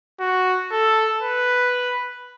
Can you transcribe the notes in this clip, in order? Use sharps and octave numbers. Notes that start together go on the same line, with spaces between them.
F#4
A4
B4